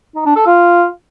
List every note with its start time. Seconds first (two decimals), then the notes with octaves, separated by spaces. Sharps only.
0.16 D#4
0.26 D4
0.36 A4
0.46 F4